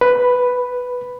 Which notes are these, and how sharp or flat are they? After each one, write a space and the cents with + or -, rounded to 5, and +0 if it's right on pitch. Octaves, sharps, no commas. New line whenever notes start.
B4 +5